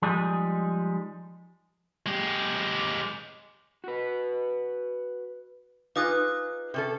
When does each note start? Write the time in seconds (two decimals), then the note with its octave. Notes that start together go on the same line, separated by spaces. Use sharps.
0.02 F3 G3 G#3 D#4 G#4
2.06 G#3 G4
3.84 F#4 B4
5.96 D#4 F4 G#4 B4 D6 F#6
6.74 C3 C#4 A4